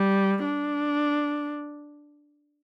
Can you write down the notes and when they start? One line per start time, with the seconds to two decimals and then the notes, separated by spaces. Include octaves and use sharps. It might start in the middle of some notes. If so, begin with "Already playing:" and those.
Already playing: G3
0.45 D4